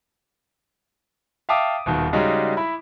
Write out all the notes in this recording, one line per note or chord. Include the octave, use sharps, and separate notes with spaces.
E5 F5 G5 A5 D6 D#6
D#1 B2 D#3
C#3 G3 G#3 D#4 F#4
E4 B5